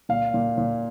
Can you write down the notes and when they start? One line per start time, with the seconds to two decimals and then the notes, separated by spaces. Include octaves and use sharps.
0.09 A#2 F5
0.34 A#2
0.58 A#2